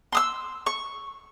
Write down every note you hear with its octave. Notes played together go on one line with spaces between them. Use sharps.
C6 D#6 E6
C#6